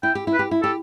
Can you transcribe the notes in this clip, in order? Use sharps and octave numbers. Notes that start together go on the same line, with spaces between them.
E4 G5
G4
E4
B4
G4
E4
G4 A4